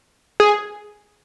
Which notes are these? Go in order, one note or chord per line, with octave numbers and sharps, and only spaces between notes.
G#4